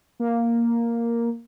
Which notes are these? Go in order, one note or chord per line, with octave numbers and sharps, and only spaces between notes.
A#3